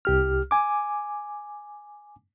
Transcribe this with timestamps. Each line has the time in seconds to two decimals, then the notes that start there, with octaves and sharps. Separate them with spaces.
0.05 C2 G4 F6
0.51 G#5 D6